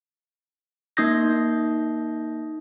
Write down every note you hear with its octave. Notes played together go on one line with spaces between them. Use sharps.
A#3 D#4 D#6 G6 A#6